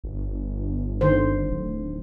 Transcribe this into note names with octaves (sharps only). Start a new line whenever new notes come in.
G1
D3 D#3 C5
D1